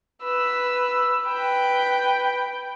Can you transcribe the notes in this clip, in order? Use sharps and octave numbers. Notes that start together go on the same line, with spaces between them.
B4 E6
B4 G5